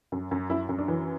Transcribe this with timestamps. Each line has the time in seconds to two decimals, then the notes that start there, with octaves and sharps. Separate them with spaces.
0.12 F#2
0.31 F#2
0.50 F#2 E4
0.69 F#2
0.79 D4
0.88 E3